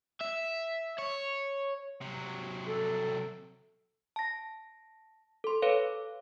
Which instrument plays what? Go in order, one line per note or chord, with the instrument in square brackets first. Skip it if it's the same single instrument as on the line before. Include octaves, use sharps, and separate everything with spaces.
[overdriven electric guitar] E5
C#5
[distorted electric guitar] C3 F#3
[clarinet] A4
[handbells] A5 A#6
A4 C6
A4 B4 C#5 F5